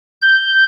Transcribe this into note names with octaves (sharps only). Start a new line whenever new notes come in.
G6